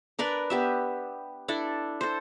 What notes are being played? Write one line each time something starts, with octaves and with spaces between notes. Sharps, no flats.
D4 A#4 B4 D5
B3 G4 E5
D4 E4 A4 D5
A4 C5